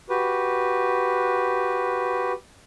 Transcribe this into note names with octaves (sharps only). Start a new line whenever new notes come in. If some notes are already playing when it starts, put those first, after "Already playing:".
F#4 G4 B4